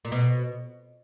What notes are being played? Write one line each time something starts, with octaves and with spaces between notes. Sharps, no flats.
A#2
B2